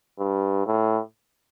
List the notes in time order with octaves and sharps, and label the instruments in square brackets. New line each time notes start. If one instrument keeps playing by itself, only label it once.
[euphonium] G2
A2